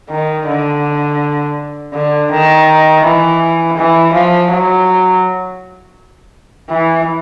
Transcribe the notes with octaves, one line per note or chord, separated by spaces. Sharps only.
D#3
D3
D3
D#3
E3
E3
F3
F#3
E3